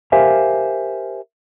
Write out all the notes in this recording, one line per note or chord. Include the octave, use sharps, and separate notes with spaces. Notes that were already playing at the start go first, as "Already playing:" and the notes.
G4 A#4 C5 E5 F5 G#5